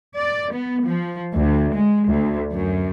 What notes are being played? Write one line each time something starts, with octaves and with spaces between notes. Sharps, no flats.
D5
B3
F3
D2
G#3
D2
F#2